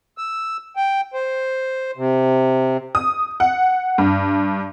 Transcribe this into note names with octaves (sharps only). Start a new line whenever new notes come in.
E6
G5
C5
C3
D#6
F#5
G2